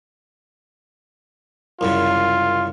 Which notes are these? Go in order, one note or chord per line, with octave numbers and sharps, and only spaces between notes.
C2 F#2 C#3 F4